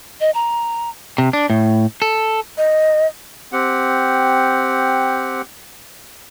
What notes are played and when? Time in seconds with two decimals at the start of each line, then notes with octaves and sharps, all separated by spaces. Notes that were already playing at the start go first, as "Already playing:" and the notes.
0.21 D#5
0.35 A#5
1.18 C3
1.33 D4
1.50 A2
2.02 A4
2.57 D#5
3.53 C4 G4 F#5